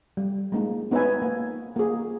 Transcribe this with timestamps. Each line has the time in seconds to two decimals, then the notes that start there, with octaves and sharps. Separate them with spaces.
0.17 G3
0.52 G#3 A#3 D#4
0.91 B3 D#4 B4 C#5 E5 G#5
1.22 A#3
1.76 A#3 G#4